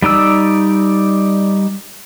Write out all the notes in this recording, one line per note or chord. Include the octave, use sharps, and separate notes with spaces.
G3 D#4 D5 E6